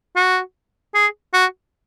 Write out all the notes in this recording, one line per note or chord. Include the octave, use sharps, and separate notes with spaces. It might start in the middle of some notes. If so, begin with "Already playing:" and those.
F#4
G#4
F#4